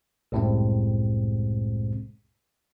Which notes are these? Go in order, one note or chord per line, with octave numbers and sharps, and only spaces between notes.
C2 F#2 A2 C3 G#3 C4